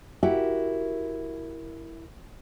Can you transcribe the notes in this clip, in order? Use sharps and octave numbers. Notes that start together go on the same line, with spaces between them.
E4 F#4 G4 A#4 E5